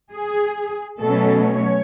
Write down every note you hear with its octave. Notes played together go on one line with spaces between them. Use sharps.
G#4
B2 F#3 A3 C#4 A4
C#5